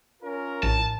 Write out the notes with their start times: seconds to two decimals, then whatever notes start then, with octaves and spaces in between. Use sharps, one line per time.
0.22 C#4 F4 A#4
0.63 A#1 A2 A5